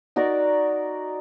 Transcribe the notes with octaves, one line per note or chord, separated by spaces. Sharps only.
D#4 F#4 A#4 D5